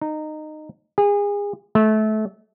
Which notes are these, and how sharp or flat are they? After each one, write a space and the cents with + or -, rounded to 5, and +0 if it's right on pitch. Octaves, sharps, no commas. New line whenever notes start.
D#4 -20
G#4 -30
A3 -25